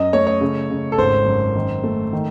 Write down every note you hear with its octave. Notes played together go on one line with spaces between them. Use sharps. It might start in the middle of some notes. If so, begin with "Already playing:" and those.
Already playing: F#2 D#5
A3 C#5
C#5
C#3
C#3
A4
G#1 C5
F#2
D#3
A3
D#3